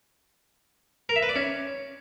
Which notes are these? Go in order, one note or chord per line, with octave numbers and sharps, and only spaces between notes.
A#4
E5
B4
D5
C#4